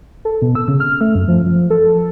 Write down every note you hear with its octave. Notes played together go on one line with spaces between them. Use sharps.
A4
B2
E6
C#3
F6
A3
F#2
F3
F3
A4